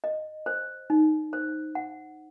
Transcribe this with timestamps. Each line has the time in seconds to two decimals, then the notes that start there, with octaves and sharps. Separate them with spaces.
0.04 D#5
0.46 C5
0.90 D#4
1.33 C5
1.75 F#5